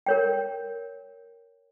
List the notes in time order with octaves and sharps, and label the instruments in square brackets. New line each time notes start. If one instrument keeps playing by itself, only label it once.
[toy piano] A#4 C#5 G5